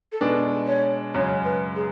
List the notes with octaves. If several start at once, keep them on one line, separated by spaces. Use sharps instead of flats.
A4
B2 G#3 D4 B4
C#5
F#2 C#3 G#3 C#5
B4
G#4